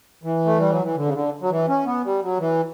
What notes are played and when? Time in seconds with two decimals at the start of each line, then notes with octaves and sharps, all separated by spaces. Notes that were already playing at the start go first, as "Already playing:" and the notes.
0.23 E3
0.45 A3
0.58 G3
0.70 F#3
0.83 E3
0.95 D3
1.05 C#3
1.13 D3
1.41 F#3
1.50 E3
1.68 C#4
1.86 B3
2.04 G3
2.22 F#3
2.40 E3